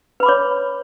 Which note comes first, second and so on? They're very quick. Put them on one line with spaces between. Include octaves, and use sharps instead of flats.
B4 B5 D6 C#5